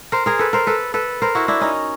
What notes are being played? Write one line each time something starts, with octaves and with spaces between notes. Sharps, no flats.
A#4 C5
G#4 A#4
A4 B4
A#4 C5
A4 B4
A4 B4
A#4 C5
E4 F#4
D4 E4
C#4 D#4